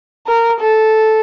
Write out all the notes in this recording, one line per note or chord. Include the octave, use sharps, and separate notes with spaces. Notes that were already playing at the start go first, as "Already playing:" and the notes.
A#4
A4